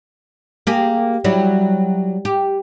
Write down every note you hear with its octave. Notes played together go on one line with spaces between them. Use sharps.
A#3 G4 G#4
F#3 G3 E4
G4